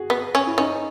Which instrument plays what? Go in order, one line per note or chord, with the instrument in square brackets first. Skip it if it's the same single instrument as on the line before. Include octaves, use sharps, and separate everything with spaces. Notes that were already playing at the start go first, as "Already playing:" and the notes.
Already playing: [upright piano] F#4 G#4
[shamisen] B3
C#4
[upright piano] E4
[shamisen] C#4 [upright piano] D#4